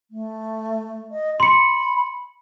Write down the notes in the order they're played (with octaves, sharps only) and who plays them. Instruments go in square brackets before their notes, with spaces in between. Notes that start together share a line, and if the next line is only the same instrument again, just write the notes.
[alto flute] A3
D#5
[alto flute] B5 [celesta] C6 C#7